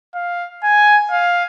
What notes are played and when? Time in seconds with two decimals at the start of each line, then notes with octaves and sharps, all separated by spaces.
0.15 F5
0.64 G#5
1.11 F5